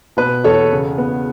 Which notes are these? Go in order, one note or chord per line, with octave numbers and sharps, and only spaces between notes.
B2 B4
E2 A4 C#5
C#3
B3